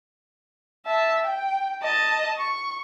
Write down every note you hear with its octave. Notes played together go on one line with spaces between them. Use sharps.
E5 A5
G5
D#5 A5
C#6